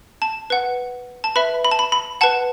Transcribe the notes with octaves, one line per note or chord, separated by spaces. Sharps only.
A5
B4 F#5
A5
B4 E5 B5
B5
A5
B5
B5
B4 F#5 A5